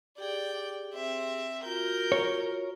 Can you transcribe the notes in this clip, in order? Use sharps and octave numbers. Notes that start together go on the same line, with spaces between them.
G4 G#4 D5 G5
C4 E5
F4 F#4 A#4 A#5 G6
C#5